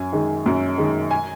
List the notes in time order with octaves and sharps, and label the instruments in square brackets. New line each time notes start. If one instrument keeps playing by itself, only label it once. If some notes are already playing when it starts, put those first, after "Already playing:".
Already playing: [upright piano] F#2 G#5
D#3 G#3
F#2
D#3 G#3
G#5